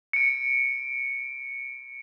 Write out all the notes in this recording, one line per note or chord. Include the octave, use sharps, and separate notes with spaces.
C#7 D7